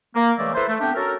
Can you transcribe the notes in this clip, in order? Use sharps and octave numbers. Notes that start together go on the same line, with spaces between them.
A#3
C#3 E3 G#3 A3 D5 E5
E4 A4 B4 C5
A3
A3 B3 C4 D4 G4
C#4 F#4 A4 A#4